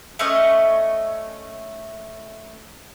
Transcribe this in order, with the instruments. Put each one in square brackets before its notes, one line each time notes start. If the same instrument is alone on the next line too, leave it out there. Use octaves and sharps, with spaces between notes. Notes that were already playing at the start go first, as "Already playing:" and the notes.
[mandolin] A3 C#4 D#5 C#6